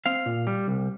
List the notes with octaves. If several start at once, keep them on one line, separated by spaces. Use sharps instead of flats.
C4 F5
A#2
G3
C2